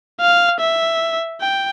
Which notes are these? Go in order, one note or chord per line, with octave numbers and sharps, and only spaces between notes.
F5
E5
G5